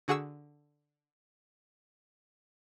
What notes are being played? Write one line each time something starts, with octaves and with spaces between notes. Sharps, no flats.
D3 F#4 G#4 F#5 C#6 E6